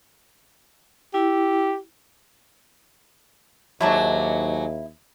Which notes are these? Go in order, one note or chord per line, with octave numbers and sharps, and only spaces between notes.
E4 G4
D#2 G#2 F#3 E4 A5 C#6